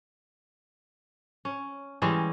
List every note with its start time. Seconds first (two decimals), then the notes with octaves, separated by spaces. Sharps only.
1.45 C#4
2.02 E3 G3 G#3 C#4